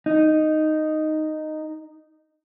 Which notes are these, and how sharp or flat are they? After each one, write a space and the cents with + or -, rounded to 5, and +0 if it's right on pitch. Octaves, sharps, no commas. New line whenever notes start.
D#4 -5